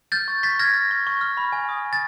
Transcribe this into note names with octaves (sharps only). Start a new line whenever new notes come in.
F6 G6 A6
C#6
C#6 A6 B6
F6 G#6 A#6
F6
C#6
C#6
F6
B5
G#5
D#6
G#5
A6